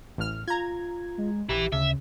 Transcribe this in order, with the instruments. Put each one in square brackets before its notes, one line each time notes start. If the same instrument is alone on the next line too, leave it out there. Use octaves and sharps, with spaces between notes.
[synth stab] A1 F6
[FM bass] F4 [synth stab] A#5 G#6
[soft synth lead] G#3
[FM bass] A#1 [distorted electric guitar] E4 B4 [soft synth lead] G4
[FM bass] D2 [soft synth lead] C#3 [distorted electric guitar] E5